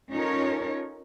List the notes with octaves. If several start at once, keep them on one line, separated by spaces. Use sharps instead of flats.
C#4 D#4 F4 A4 A#4 C#5